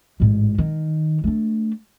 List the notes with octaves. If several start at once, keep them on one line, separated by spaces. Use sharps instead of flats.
A1 G#2
D#3
A3 D4